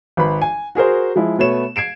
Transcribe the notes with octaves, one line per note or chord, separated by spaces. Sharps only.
G#1 B4 B5
G#5
F#4 G#4 A#4 C5
F3 G#3 E4
B2 A3 B3 C#5 E7
G#6 C7 D7 E7